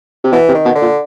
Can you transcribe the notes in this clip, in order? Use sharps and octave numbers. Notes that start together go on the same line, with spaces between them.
C3
B2 E3
C3
D#3
B2
D3
A#2